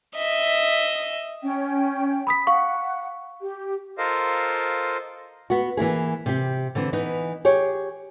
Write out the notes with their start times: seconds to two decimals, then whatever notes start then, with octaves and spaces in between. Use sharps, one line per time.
0.16 D#5 E5
1.43 C#4 G5
2.27 B5 D#6 B6
2.47 F5 F#5 C#6
3.42 G4
3.98 F4 A4 A#4 C5 D#5 F5
5.50 B3 F#4
5.77 E3 A#3 E4 G#4
6.26 C3 G4
6.75 D3 E3 C4
6.93 E3 B3 D#4
7.45 G4 G#4 C#5